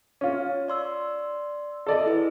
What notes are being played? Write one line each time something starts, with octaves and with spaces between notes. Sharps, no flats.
C#4 F4
D5 C6 E6
A4 D5 D#5
E4 G#4 B4